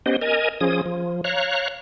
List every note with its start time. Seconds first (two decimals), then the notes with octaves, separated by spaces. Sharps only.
0.06 B3 C#4 G4 C5 D#5
0.22 A#4 D#5 G#5
0.61 F3 C#4 G#4 D#6
0.86 F3
1.24 C#5 F5 A#5 F#6